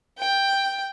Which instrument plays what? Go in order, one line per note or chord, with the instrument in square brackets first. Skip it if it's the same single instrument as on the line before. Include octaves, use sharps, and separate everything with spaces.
[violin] G5